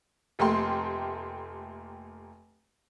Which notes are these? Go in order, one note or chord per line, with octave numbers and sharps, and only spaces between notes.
F1 A3 A#3 G4 C6